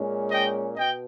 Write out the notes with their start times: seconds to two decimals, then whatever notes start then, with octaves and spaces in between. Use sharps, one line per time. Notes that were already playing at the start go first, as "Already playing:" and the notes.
Already playing: A#2 G#3 C#4
0.31 D#5 G5
0.77 B2 D#5 G5